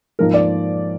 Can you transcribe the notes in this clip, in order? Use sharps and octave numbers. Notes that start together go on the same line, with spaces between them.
G#2 F3 A#3 D#4 A#4
D5